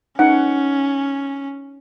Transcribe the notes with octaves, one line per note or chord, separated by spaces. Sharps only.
C#4 D#4 F#5